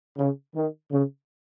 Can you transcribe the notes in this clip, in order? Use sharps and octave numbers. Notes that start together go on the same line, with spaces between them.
C#3
D#3
C#3